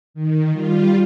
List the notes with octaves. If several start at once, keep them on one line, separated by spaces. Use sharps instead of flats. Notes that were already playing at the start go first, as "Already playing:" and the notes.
D#3
G3 F4